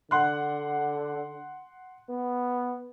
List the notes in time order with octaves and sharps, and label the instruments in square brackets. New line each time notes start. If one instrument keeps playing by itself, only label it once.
[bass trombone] D3 [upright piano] F#5 C6 F#6
[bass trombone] B3